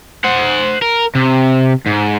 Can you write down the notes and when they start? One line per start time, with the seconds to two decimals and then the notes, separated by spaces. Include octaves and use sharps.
0.24 C5 F#5
0.82 A#4
1.15 C3
1.86 G#2